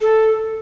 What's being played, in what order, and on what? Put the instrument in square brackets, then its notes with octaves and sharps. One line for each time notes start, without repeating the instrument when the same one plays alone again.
[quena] A4